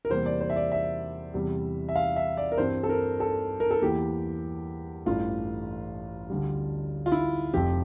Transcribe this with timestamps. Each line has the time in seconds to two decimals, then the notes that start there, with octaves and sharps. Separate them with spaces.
0.05 A#4
0.09 E2 C3 G3 A#3 C5
0.26 D5
0.41 C5
0.50 E5
0.56 D5
0.72 E5
1.34 E2 C3 G3
1.88 E5
1.95 F5
2.16 E5
2.37 D5
2.52 A#4
2.58 G2 E3 G3 C4 C5
2.83 A4
2.89 A#4
3.20 A4
3.60 A#4
3.71 A4
3.81 E2 E3 A#3 G4
5.06 A1 G2 E3 A3 F4
6.30 D2 D3 G3
7.06 F4
7.12 E4
7.53 F1 F2 C3 F3 G4